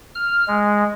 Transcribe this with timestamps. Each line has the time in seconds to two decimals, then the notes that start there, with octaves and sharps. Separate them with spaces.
0.15 F6
0.48 G#3